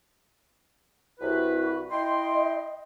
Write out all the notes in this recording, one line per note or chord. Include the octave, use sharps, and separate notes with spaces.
C2 E4 F#4 B4
E4 D#5 G5 C6